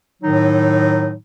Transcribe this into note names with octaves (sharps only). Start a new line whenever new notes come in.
A2 D#3 F#3 D#4